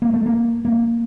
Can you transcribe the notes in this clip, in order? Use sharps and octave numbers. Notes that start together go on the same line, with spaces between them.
A#3
A3
A#3
A#3